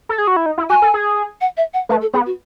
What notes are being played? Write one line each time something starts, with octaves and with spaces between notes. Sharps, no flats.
A4
G#4
F#4
E4
D#4
E4
F#4 G#5
A4
G#4
F#5
E5
F#5
A3 B4
A4
B3 G#4
F#4